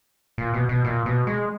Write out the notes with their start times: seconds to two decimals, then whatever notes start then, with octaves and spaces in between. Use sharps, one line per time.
0.38 A#2
0.54 B2
0.69 B2
0.84 A#2
1.06 B2
1.27 G#3